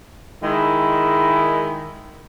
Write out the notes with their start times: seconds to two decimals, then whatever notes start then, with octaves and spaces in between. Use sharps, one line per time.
0.43 D#3 G#3 E4